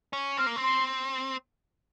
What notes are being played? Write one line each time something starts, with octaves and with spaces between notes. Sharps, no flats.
C#4
C4 F6
A#3
C4
C6